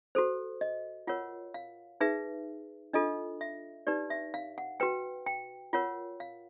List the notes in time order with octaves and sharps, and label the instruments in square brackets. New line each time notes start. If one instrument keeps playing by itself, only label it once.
[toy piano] F#4 A4 C5
D#5
F4 A#4 C#5 F#5
F5
D#4 G#4 B4 E5
D4 F4 A4 D#5
E5
D#4 G4 B4 D5
E5
F5
F#5
F#4 B4 G5
G5
F4 A#4 C#5 F#5
F5